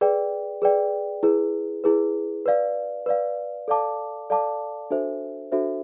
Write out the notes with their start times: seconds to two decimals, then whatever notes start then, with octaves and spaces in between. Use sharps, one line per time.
0.01 G#4 B4 D5 G5
0.62 G#4 B4 D5 G5
1.23 E4 G#4 B4
1.84 E4 G#4 B4
2.46 B4 D5 F5
3.06 B4 D5 F5
3.68 A4 D5 F5 A5 D6
4.30 A4 D5 F5 A5 D6
4.90 D4 F#4 A4 C5 E5
5.52 D4 F#4 A4 C5 E5